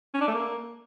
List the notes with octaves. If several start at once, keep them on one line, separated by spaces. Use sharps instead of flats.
C#4
D4
A3
A#3